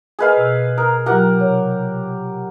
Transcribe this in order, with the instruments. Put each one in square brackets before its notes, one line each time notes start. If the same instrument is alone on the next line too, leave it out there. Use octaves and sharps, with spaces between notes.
[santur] G#4 B4 F5 [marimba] A#4 D#5 G#5
[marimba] B2 E6
[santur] A#4 [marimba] D#6
[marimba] F#3 F4 [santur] G4 A#4 F#5
[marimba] C3 C#5